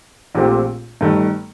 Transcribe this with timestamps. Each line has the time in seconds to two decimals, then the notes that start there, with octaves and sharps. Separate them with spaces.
0.35 A#1 A#2 A3 C4 G4
1.01 G1 G2 D#3 A3